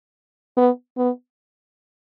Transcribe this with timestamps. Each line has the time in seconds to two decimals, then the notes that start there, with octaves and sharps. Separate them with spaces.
0.57 B3
0.97 B3